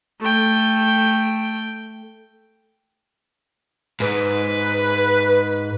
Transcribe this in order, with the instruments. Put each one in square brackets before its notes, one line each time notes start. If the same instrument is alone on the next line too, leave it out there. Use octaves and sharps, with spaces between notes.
[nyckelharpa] A3 G5
[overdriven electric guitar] G#2 [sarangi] B4